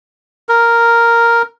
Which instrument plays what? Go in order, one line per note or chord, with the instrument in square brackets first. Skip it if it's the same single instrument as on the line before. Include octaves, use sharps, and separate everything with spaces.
[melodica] A#4